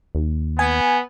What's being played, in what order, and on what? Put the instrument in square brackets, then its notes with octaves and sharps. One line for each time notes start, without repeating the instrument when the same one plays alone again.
[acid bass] D#2
[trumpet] B3 [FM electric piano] G#5